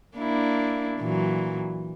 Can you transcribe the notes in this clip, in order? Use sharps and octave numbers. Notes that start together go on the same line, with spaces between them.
A#3 D4 E4
A#2 E3 F#3